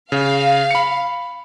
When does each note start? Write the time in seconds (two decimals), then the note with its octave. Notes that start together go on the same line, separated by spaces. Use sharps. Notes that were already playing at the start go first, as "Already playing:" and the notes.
0.12 C#3 F5
0.71 B5 C#7